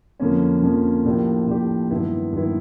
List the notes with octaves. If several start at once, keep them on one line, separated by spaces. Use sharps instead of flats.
F2 D3 F3 A#3 C#4
F2 D3 F3 A#3 C#4
A2 F3 A#3 D4 G4
A2 F3 A#3 D4 G4
G2 D#3 F#3 B3 E4
G2 D#3 F#3 B3 E4